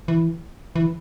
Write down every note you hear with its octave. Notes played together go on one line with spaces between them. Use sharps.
E3
E3